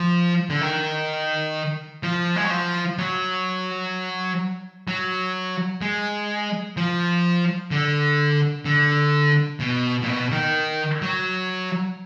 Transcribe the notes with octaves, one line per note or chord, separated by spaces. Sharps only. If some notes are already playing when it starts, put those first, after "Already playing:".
Already playing: F3
D3
D#3
F3
G#3
F#3
F3
F#3
F#3
G#3
F3
D3
D3
B2
A#2
B2
D#3
F#3